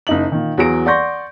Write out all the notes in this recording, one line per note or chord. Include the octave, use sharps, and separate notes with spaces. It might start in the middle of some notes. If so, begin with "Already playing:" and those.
F#1 D#4 F#7
A#2 D#3
E2 F#3 G#4 A#6 D7
D5 F#5 C6 C#6 G6 A#6